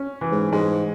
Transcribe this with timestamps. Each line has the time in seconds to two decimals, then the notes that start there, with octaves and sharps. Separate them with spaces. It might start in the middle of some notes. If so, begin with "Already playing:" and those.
Already playing: C#4
0.21 E3
0.32 G#2
0.52 G#2 G#3